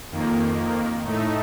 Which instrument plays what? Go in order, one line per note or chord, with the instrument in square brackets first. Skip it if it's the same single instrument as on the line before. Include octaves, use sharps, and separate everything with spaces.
[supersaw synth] F2 D#3 A#3
A2 A3 D#4